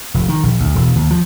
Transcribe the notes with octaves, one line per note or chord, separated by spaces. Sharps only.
F1
D#3
A#1
D2
E1
D#2
F3